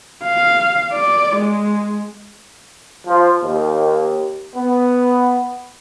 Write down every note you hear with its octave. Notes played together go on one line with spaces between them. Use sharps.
F5
D5
G#3
F3
D#2
B3